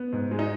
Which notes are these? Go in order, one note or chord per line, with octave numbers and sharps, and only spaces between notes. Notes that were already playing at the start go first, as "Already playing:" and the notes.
Already playing: B3
G#2
G#3
D#4